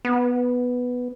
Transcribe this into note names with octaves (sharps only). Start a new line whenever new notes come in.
B3